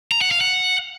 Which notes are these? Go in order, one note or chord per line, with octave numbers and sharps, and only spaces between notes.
A#5
F#5
F5
F#5